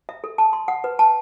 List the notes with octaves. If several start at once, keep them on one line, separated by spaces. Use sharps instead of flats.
E5
A4
A5
C6
F#5
B4
A5